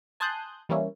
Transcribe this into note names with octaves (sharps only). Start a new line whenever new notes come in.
G#5 A5 C6 D#6 F#6 G6
E3 G3 A#3 C#4 E4